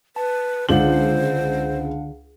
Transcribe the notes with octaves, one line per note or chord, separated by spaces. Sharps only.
B4 A5
C#2 D3 D4 C5 F5 F#5 F#7